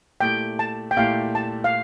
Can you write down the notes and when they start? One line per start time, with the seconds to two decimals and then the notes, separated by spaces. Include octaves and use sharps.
0.20 A#2 A3 E4 G4 G5
0.59 A5
0.91 G5
0.97 A#2 A3 E4 G4 F5
1.35 A5
1.64 F5